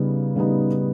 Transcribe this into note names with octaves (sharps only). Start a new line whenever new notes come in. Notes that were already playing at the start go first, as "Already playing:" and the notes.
Already playing: C#3 G3 B3 D#4
C#3 G3 B3 D#4